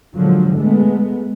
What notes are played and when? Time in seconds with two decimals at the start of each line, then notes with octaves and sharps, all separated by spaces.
0.16 A#2 D3 F3 F#3 G#3
0.56 G#3 A3 B3